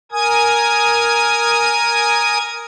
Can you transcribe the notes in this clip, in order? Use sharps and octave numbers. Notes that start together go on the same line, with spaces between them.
A#4 G#5 D#6 G#6